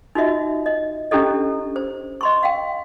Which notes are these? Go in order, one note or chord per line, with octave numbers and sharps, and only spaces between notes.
D#4 F4 F#4 D#5 E5
D#5
C#4 D4 E4 G4 A4 D#5
C5
D#5 C6 C#6
F5 G5